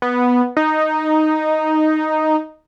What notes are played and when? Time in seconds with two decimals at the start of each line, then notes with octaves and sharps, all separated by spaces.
0.02 B3
0.57 D#4